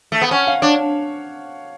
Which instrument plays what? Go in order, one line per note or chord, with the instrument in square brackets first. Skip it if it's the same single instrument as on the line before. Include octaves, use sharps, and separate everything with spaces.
[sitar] A3
B3
[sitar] C#4 [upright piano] F#5
[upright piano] F5
[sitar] D4 [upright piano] C#5